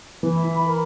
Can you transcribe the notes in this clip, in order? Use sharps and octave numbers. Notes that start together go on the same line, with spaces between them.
E3 E4
E5
B5
A#4